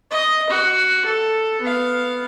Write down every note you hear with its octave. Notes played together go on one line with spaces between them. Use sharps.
D#5
F#4
A4
B3 F5